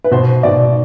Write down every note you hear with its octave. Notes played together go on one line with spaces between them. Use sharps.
B4
B2 C5
B2 D5